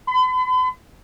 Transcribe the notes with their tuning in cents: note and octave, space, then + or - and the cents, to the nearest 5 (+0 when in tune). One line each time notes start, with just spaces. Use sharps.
B5 +45